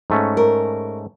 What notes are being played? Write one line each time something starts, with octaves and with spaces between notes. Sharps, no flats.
G#2 A3 C#4
A#4